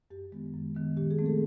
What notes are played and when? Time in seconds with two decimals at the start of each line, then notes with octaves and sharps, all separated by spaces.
0.10 F#2 G4
0.32 D#3 G#3 B3
0.54 F#2
0.75 D#3 G#3 B3
0.97 A#2 G4
1.11 G#4
1.19 F3 A3 C4
1.26 A4